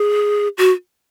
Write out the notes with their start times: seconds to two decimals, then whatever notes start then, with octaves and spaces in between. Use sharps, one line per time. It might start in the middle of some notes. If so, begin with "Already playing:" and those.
Already playing: G#4
0.58 F#4